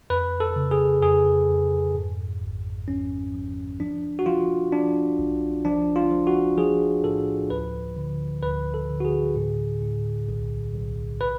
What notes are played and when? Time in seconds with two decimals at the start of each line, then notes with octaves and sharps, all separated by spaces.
0.10 F2 B4
0.40 A4
0.56 C#3
0.71 G#4
1.02 F2 G#4
1.48 F2
1.95 G#2
2.42 G#1
2.88 F3 C#4
3.33 F3
3.80 F3 D4
4.19 F#4
4.26 F3 F4
4.72 F3 D4
5.19 B1
5.65 F3 D4
5.96 F4
6.11 F3
6.27 F#4
6.57 F3 G#4
7.04 A2 A4
7.50 D2 B4
7.97 D3
8.43 D2 B4
8.74 A4
8.89 D3
9.00 F#4
9.05 G#4
9.36 A2
9.82 A2
10.28 B1
10.74 B1
11.21 B4